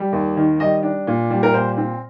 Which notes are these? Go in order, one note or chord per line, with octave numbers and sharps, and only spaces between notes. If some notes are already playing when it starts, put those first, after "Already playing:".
Already playing: G3
D#2
D#3
G3 D#5
D4
A#2
G3
A#4
A#2 C5
C4